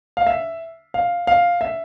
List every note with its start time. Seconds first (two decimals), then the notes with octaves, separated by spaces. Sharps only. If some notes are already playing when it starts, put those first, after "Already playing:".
0.17 F5
0.27 E5
0.94 F5
1.27 F5
1.61 E5